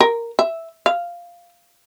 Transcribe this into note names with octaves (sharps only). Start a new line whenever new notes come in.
A#4
E5
F5